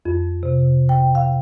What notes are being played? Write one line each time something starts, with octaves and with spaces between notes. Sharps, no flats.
F2
C3
G5
F5